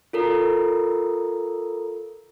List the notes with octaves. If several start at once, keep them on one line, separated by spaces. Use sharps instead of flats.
F4 A4 A#4